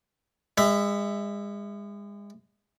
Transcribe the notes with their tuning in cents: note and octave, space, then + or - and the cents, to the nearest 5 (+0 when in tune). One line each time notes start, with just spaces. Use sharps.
G#3 -35 E5 +0